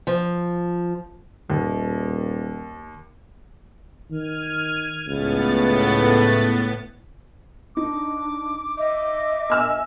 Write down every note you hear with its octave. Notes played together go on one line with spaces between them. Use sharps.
F3
D#1 D#2
D#3 F6 G#6 D#7
C#2 A2 B3 A6
D4 D#4 D6
D#5 E5
G#5 E6 F6